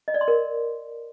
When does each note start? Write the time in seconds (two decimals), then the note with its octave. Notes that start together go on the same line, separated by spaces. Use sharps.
0.08 D#5
0.14 D5
0.21 C6
0.28 A#4